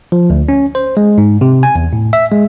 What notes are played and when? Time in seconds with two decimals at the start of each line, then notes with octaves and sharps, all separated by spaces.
0.12 F3
0.30 D2
0.49 C#4
0.75 C5
0.97 G#3
1.18 G#2
1.41 C3
1.63 G#5
1.75 E2
1.93 A2
2.13 E5
2.32 G#3